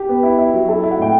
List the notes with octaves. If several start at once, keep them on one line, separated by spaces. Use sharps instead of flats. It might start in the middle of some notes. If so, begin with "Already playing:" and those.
Already playing: G4
B3
E4
E4
F#3
E4 A4
E4
F#5
A2 G5